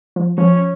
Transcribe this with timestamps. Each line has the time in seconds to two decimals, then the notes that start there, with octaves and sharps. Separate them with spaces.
0.16 F3
0.38 F3 C#4